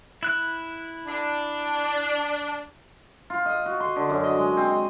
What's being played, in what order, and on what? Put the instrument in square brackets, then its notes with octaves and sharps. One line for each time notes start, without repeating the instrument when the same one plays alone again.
[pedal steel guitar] E4 F#6
[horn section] D4
[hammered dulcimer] F4
D#5
F#4
C6
D3
F#2
D#5
G#3
C4
D#5